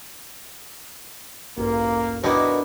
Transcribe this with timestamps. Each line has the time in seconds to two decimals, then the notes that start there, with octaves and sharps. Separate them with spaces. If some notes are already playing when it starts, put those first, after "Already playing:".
1.58 A1 D2 G2 A#3
2.24 B2 D#3 D4 E4